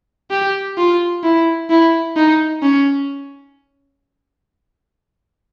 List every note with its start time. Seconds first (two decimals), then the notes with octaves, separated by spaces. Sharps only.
0.31 G4
0.78 F4
1.24 E4
1.70 E4
2.16 D#4
2.62 C#4